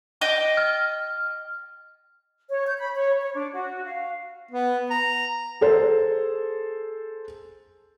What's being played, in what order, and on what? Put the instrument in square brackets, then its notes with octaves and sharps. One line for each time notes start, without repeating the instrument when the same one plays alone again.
[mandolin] D#5 G5 D6
[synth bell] F6
[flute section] C#5
G6
B5
C#5
C#5
D4
F#4
F5
[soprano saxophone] B3
A#5
[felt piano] G#4 A4 C5